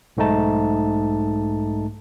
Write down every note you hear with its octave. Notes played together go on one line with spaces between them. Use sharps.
B1 G#2 A3 D#4 A5